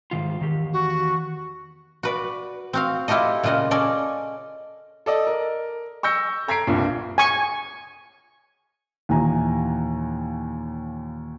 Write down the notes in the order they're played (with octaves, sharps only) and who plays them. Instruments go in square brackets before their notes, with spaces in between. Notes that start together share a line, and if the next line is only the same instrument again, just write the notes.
[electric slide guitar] G#2 D#3 F4
E2 D#3 G4
[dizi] F#4
[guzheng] F#4 B4 D5
C4 F#4 F5
E4 F4 G4 A4 D#5
A#2 C#3 F4 D#5 F#5
C#4 A4 D5 D#5 G#5
[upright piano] A4 D5 D#5
A#4
C#6 E6 G6 A#6 C#7
A4 A#5 G#6 B6 C7 D7
C2 G2 A#2
[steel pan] G#5 C#6
[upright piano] D#2 A#2 E3 G#5 A#5